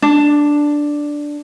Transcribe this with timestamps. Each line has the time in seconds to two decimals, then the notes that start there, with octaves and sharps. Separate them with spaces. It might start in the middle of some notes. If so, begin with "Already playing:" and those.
0.02 D4